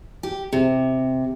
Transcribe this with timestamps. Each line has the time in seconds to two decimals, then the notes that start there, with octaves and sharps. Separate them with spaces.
0.23 G4
0.53 C3